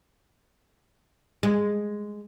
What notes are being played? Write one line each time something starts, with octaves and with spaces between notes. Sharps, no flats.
G#3